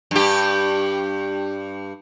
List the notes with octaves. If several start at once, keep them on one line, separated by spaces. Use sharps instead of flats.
G2 G4